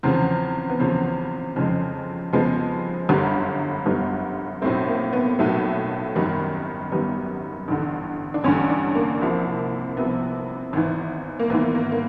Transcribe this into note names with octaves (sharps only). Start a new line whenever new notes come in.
E2 C#3 F3 C4
B3
E2 C#3 F3 C4
F2 C#3 F3 G#3
F2 C#3 F3 G#3 B3
G1 F#2 D3 G3
G1 F#2 D3 G3 B3
B1 A2 F#3 A3 C4
A#3
B3
B1 A2 F#3 A3
G#1 F#2 D#3 G3
G#1 F#2 D#3 G3 B3
A1 G2 D3
D4
A1 G2 D3 C#4
D4
A#3
C2 C3 F3
C2 C3 F3 B3
G#1 G#2 E3
A#3
G#1 G#2 E3 B3
A#3
A#3